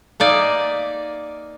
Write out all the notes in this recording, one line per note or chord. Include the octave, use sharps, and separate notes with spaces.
A#3 D#4 D5 E5 G#5